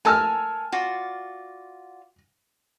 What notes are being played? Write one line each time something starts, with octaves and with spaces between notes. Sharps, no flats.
A4 A#4 G#5 E6 F6
F4 F#4 D5